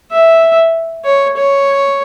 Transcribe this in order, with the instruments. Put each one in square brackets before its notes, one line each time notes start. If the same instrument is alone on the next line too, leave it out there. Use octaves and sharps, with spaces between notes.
[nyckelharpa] E5
C#5
C#5